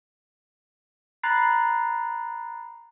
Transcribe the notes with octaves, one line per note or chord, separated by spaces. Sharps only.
A#5 B5 F#6 A6 C7